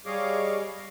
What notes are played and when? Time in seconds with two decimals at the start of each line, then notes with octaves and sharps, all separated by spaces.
0.06 G3 G#4 C#5 D#5 F5 D6